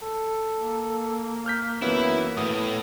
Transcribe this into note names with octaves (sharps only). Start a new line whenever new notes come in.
A4
A#3
F6 G6 B6
F#2 E3 B3 E4
A2 B3 D#6